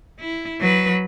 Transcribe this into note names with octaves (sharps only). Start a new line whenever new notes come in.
E4
F#3 B4